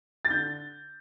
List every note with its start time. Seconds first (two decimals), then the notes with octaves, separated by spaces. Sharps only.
0.25 A6
0.30 D3 G6